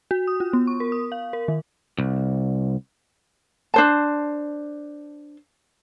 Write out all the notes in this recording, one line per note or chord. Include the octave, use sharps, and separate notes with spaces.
F#4
D#6
F4
B3
C#6
A#4
D#6
F5
A#4
D#3
C2
D4 C5 A5